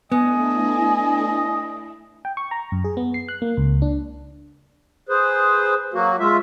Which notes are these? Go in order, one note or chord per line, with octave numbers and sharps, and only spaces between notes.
A3 B3 D4 E4 D#5 G#5
G5
C#6
A#5
F#2
G#4
B3
C7
F#6
A#3
C#2
D4
G#4 B4 C5
F#3 A#3 F#4
G#3 F4 E5